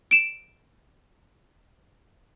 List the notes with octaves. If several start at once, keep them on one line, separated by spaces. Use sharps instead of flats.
D7 E7